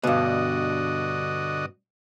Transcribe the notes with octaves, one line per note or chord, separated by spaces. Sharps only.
G2 B2 D3 F#4 D#5